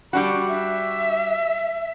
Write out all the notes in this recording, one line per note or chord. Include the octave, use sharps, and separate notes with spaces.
G3 D4 F#4 B5
E5